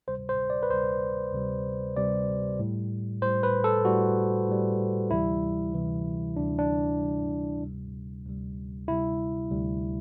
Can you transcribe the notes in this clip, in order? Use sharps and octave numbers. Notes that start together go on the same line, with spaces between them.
D2 C3 G3 C5
C5
D5
B4
D2 C3 G3 C5
D2 C3 G3
D2 C3 G3 D5
A2 G3
A2 G3 C5
B4
A4
A2 G3 F#4
A2 G3
D2 C3 E3 G3 E4
D2 C3 E3 G3
D2 C3 E3 G3 D4
D4
D2 C3 E3 G3
D2 C3 G3
D2 C3 G3
D2 C3 G3 E4
D2 C3 G3